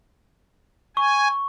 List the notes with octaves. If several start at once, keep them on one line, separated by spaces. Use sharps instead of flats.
G#5 C#6